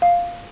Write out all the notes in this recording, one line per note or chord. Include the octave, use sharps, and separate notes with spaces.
F5